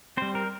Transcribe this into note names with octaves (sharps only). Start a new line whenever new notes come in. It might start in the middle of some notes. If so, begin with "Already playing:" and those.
G3 C4 C5
A#4